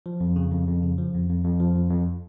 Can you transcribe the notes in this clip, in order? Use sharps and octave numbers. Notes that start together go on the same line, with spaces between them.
F3
F2
C#3
F2
F2
C#3
F3
F2
F2
F2
F3
F2
F2